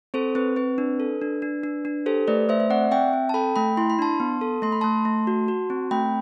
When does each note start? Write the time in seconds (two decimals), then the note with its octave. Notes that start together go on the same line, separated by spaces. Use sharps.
0.14 C4 A4 C5
0.35 C4 B4
0.56 C4 B4
0.78 D4
1.00 A4
1.22 D4
1.42 D4
1.64 D4
1.85 D4
2.06 G4 A4 C5
2.27 A3 B4 D5
2.49 A3 C5 E5
2.60 E5
2.70 C4 D5 F#5
2.91 C4 E5 G5
3.13 C4
3.29 A5
3.34 A4 G5 B5
3.56 A3 G5 B5
3.77 E4 C6
3.90 B5
3.99 D4 A5 C6
4.20 B3
4.41 A4
4.62 A3 C6
4.72 B5
4.81 A3 A5 C6
5.05 A3
5.27 F#4
5.48 F#4
5.70 C4
5.91 A3 G5 B5